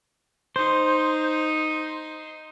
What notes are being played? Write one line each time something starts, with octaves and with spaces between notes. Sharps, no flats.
D#4 C5